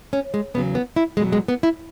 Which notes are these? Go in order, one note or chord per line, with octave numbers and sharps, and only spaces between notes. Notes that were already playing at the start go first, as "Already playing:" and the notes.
C#4
G#3
E2 C#3 F#3 B3
B3
E4
E2 B2 F#3 G#3
G#3
B3
E4